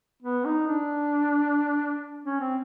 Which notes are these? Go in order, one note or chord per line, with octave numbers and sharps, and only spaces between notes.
B3
D#4
D4
C#4
C4